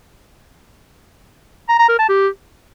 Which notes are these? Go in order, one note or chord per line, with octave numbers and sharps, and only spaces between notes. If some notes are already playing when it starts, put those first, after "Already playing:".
A#5
A#5
A#4
A5
G4